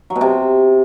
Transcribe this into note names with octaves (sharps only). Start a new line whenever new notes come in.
F#3
B2
C3